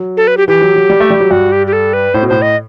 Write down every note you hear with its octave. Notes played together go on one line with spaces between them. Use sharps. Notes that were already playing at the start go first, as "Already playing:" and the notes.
Already playing: F#3
A4
B4
G4
E3 G4
F#3
F#3
G3
A3
G3
F#3
G2 F#4
G4
G4
A4
B4
A2 C5
B2
A2 C5
D#5